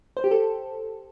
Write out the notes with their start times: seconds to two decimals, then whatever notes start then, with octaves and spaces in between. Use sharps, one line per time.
0.17 C5
0.24 G4
0.31 A4